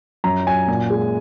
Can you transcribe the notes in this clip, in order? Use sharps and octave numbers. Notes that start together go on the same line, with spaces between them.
F#2 A#5
F#3 G#5
A#2
G#3